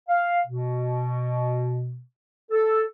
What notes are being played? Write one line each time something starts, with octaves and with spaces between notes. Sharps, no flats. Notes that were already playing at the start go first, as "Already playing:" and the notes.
F5
B2
A4